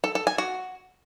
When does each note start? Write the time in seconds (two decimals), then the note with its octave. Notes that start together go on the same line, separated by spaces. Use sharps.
0.04 A4
0.15 A4
0.27 G#5
0.38 F#4